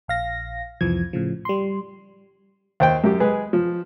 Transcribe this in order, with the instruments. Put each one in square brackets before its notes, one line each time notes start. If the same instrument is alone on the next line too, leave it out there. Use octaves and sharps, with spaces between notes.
[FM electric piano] A#1 F5 A#6
C2 F2 E3 F3 G#6
A2 C#3 F3
G3 C6
[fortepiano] D#2 C5 G5
F#2 G4
G#3 G#4 B4
F3